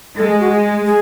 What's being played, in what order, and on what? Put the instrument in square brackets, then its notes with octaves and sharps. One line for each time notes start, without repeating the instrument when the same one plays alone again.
[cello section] G#3 [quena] A4
[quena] G#4
F#4
G#4
G#4